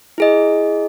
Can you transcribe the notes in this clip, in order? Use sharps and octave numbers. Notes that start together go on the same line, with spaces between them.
E4 G#4 D#5